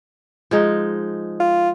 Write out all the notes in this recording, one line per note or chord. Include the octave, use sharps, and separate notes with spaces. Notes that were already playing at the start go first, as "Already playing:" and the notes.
F3 G#3 D#4
F4